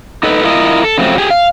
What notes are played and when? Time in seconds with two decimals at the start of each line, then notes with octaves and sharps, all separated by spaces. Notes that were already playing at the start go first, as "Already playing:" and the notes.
0.23 D#4 A4 B4
0.44 E4 F4 A#4 D#5
0.84 A4
0.98 C#3 F3 F#3 A3 C4
1.18 G4 G#4
1.30 F5